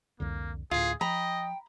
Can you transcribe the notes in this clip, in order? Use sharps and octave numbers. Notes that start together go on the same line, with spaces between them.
C2 F2 D3 A#3
D2 A2 F4 G#4
F3 D#5 G5 A#5 B5